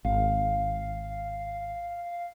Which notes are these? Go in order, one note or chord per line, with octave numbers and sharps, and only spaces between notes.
G#1 F5